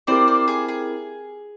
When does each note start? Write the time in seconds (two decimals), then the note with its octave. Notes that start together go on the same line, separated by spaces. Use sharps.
0.07 C4 E4 G4 A#4 C5 D5
0.28 C5 D5
0.48 G#4
0.68 G#4